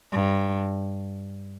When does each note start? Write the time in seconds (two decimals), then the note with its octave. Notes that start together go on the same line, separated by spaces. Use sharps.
0.12 G2